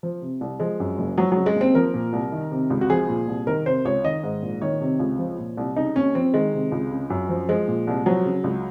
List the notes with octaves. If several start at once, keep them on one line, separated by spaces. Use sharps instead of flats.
F3
C3
C2
F3 G#3
F#2
F#1
F3 F#3
C#3 F#3
G#3
D#2
C4
F3 A#4
A#2
C2
D#3
C3
C#2
F#4
F3 G#4
A#2
C2
D#3 A#4
C3 C5
C#2 C#5
D#3 D#5
G#2
A#1
D#3 C#5
C3
C#2
F3
A#2
C2
C#3 D#4
D#2 C#4
F3 C4
D#3 G#3
C3
C#2
C#3
F#2
F3
F3 G#3
A#2
C2
F3 F#3
C#3
C#2